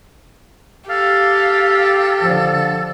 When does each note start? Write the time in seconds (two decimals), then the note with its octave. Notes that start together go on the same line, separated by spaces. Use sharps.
0.90 G4 A4 F5
2.21 D3 F3